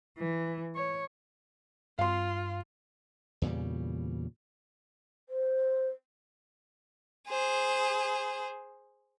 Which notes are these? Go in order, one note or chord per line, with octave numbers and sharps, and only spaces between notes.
E3
C#5
G2 F4 F5 C6
E2 A#2 C#3 G3
C5
G#4 C5